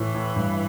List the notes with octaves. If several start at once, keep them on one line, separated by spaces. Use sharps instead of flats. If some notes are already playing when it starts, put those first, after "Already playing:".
Already playing: A2 E3
A2
G2